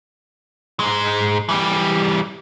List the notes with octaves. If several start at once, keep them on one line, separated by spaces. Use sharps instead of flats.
G#2 G#3
E3 G3